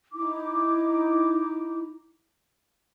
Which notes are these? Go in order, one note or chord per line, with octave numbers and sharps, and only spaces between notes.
D#4 E4 D6